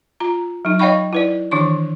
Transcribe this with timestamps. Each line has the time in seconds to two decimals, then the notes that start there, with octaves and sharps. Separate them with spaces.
0.20 F4 A#5
0.65 F#3 D#4
0.79 C#5 D#5 F5 G5 B5 C#6
1.13 E4 B4 D5
1.51 D#3 E3 D4 C#6